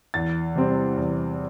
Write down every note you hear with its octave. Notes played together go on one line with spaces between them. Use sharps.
E2 A6
C3 G3 C4
E2